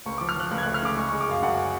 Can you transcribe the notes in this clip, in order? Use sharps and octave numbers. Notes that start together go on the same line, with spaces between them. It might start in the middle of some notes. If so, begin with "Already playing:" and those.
C#2 C#6
F3 D6
F6
F3 F#6
C#2 F#6
G#6
F#6
A3
F6
C#3 D6
G#3 C#6
C#6
G#3
D6
F#2 F5
F#2 F#5
G#5